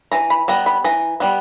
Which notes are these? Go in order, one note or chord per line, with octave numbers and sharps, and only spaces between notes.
E3 A#5
B5
G3 B3 A#5
B5
E3 A#5
G3 B3